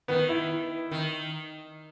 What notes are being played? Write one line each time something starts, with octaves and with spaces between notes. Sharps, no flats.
D#3 B3
E4
D#3